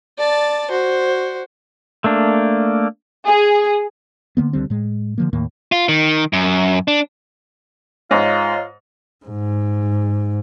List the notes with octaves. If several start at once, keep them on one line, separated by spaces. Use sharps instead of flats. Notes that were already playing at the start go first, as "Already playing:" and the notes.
D5 A5
F#4 C5
A3 A#3 D4
G#4
D3 D#3 A#3 B3
C#2 D3 G3 C4
A2 G#3
D3 F3 A#3
D#2 A2 D#3 A#3
F4
D#3
F#2
D4
G#2 F4 C#5 D#5 A#5
G#2